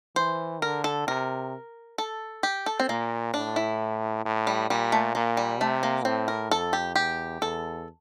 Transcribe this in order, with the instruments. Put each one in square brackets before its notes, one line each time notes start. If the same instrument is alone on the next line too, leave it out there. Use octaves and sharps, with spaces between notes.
[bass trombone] E3 [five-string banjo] C5
[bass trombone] D3 [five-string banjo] A#4
[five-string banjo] A4
[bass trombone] C3 [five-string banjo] A#4
[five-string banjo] A4
G4
A4
C4
[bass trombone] A#2 [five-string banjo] A#3
[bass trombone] A2 [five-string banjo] D4
[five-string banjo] E4
[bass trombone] A2
[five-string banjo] G3
[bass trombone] A#2 [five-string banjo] G3
[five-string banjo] A3
[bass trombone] A#2 [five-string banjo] A#3
[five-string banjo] G3
[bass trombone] C3 [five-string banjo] A3
[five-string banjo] A#3
[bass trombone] A2 [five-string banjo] C4
[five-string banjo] A#4
[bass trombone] F2 [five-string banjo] A4
[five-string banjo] G4
[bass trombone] E2 [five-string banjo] G4
[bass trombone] E2 [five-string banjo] A4